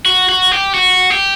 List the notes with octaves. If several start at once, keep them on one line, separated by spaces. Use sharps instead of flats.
F#4
F#4
G4
F#4
G4